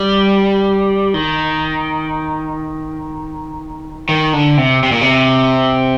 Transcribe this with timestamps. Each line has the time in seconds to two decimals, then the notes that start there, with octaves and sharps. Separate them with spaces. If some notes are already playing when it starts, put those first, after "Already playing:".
Already playing: G3
1.14 D#3
4.09 D#3
4.33 D3
4.57 C3
4.83 C3
4.92 A#2
5.01 C3